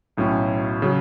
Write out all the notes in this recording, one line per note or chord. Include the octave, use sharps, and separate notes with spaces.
B1 A2 F#3 C#4
C#3 F#3